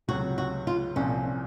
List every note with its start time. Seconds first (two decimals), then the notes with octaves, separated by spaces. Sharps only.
0.08 C#2 C3 F#3 F#4
0.38 F#4
0.67 F4
0.96 C2 A#2 F3 C4 C#4